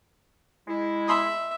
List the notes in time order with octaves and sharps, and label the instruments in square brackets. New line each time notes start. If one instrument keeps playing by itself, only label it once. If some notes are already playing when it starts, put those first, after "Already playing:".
[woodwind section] G#3 E4
[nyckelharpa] E5 [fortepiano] B5 C6 D#6